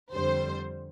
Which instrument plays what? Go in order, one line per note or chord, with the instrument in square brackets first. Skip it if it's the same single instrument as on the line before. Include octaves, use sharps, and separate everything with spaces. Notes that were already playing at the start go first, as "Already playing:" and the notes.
[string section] F2 D3 G3 C5